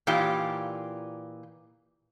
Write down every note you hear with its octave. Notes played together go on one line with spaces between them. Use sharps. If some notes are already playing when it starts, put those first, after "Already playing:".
A#2 E3 D#4 F4 G4